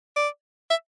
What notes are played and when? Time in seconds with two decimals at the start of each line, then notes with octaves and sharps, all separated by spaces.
0.16 D5
0.70 E5